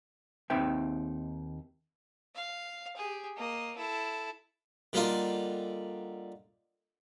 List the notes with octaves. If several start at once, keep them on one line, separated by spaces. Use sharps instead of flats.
D#2 C4 D#4 B4 E5 G5
F5
G4 G#4
A#3 D#5
E4 A4
D3 G3 A#3 D#4 F4 F5